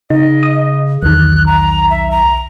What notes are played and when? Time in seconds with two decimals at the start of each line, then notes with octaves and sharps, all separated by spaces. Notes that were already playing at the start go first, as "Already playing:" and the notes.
0.10 C#3 D#4 D#5
0.43 D#6
1.03 B1 E2 D#3 F#6
1.46 A#5
1.90 E5
2.11 A#5